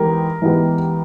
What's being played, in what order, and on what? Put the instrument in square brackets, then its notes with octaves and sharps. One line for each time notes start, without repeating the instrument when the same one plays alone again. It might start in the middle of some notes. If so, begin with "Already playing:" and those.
Already playing: [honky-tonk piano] E3 G#3 B3 G4 [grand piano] A#4
[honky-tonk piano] E3 G#3 B3 E4 G4